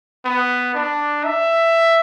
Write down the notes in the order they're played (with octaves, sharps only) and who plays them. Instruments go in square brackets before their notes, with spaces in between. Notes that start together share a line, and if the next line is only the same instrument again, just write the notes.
[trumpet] B3
D4
E5